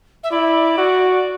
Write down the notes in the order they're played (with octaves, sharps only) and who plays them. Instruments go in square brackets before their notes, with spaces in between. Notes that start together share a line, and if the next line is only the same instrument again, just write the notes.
[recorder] E5
[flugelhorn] E4 [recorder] D5
[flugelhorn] F#4